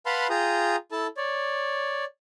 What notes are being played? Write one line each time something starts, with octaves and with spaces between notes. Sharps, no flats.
B4 F5 F#5 A5 B5 C6
F4 G#4 G5 A#5 D#6
E4 A4 A5
C#5 D5